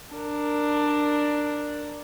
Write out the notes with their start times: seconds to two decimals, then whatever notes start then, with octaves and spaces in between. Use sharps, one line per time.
0.14 D4 A#4